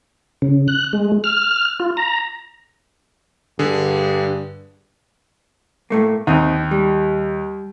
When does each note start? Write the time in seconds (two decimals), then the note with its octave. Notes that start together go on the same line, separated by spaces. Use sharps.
0.42 C#3
0.68 F#6
0.93 G#3
1.24 F6
1.80 F4
1.97 A#5
3.59 G2 D3 G#4
5.90 A2 A3 A#3
6.27 D#2 C4 D#4
6.71 G3